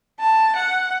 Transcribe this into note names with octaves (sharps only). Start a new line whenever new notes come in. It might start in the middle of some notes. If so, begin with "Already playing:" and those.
A5
F#5